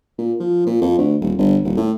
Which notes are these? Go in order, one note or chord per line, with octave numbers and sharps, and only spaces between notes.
A#2
F3
A#2
F2
D2
D#1
G1
D#1
A2